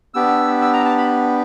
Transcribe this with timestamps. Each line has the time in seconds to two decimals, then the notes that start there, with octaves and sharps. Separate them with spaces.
0.14 B3 D4 G4 E6
0.62 E6
0.73 A#5
0.85 A5
0.98 B5